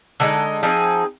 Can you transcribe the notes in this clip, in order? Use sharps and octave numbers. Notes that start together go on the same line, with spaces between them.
D3 G#3 D#4
F3 C4 D#4 G#4